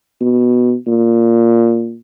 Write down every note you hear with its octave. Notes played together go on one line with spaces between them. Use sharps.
B2
A#2